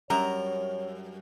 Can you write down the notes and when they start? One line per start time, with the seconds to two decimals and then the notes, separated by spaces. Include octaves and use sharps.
0.10 F#2 G3 A#4 C#5 A#5